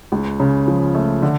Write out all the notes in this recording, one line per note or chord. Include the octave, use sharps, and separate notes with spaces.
C#2
C#3
F3
A3
D3